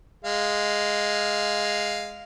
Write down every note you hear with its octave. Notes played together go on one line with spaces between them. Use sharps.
G#3 F5